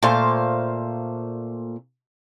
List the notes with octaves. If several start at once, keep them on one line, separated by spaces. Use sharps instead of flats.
A#2 A3 C5 F5